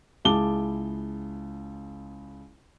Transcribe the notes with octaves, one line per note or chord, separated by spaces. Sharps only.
C#2 E4 G#4 A5 D6 G7